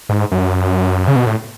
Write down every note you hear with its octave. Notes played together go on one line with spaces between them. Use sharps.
G#2
F#2
C#3
B2
A2